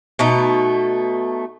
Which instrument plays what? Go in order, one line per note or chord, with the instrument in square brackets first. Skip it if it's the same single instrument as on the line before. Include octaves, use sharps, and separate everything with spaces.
[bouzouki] B2 A3 D#4